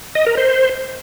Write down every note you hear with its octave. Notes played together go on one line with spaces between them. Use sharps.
D#5
A#4
C5